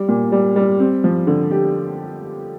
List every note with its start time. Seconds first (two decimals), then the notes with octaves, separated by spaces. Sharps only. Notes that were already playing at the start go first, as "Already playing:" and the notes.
Already playing: G3
0.08 A#2
0.32 G3
0.56 G3
0.80 C4
1.04 F3
1.27 D3
1.51 G4